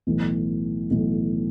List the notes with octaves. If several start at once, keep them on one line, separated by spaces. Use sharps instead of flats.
B1 A2 E3
B1 A2 E3